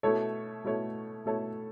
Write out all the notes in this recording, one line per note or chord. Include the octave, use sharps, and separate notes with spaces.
B2 A3 E4 A4 C#5
B2 A3 E4 A4 C#5
B2 A3 E4 A4 C#5